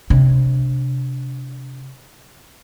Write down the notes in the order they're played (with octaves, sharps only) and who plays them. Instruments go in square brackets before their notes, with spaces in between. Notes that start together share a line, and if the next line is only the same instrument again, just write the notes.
[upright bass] C3 D4